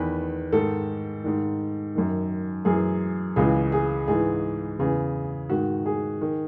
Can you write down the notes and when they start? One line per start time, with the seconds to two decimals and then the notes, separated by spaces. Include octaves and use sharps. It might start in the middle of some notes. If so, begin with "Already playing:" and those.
Already playing: E2 D#3 B4
0.52 G#2 D#3 A4
1.24 G#2 D#3
1.95 F#2 D#3
2.65 F#2 E3 G#4
3.36 C#2 C#3 E3 G#4
3.72 G#4
4.08 G#2 E3 G#4
4.79 E2 C#3 E3 G#4
5.50 G#2 D#3 F#4
5.86 G#4
6.21 D#3